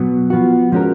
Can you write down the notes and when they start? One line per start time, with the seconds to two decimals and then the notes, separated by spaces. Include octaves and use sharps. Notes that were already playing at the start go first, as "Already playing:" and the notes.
Already playing: B2 F#3 B3
0.30 F3 B3 F#4
0.72 F3 G#3 C#4 F#4 A#4